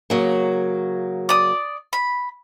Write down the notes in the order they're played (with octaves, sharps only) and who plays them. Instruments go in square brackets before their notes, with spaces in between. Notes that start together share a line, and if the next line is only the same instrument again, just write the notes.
[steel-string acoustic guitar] C#3 F#3 A#3
[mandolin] D5 D#6
B5